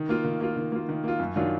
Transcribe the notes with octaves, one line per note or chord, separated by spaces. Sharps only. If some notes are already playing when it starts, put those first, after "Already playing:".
Already playing: D#3
A#3 F4
D#3
A#3 F4
D#3
A#3 F4
D#3
A#3 F4
F#2
D#3 F#3 D4 F4